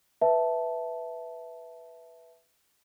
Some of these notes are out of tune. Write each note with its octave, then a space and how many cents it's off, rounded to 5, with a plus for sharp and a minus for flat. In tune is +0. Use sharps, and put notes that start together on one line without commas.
B4 +0 E5 -5 A5 -5